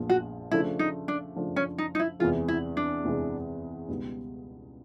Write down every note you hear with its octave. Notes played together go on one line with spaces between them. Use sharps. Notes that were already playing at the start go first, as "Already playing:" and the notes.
Already playing: A#1 A#2 F3 G#3 B3
F#4
C#3 F3 A3 D4 E4
D#4
D4
C#3 F3 A3 D4
C#4
D#4
D#4
E4
E2 C3 E3 G#3 F4
E4
D4
E2 C3 E3 G#3
C#2 B2 G3 B3 D#4